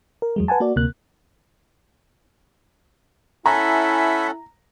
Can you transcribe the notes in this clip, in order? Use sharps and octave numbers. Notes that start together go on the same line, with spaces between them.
A#4
E2 F#3 G#3
B4 F#5 G#5 A5
A#3 F#4 D5
D2 C3 A#3 F#6
C#4 E4 A4 E5 F#5 G#5 A#5 B5